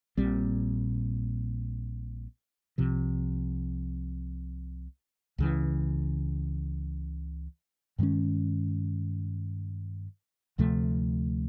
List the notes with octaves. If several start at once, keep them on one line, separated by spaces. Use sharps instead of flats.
A#1 A#2 G3 C4
C2 C3 F3
C#2 C#3 E3
G2 D#3 G#3 C#4
D2 C3 F3 A3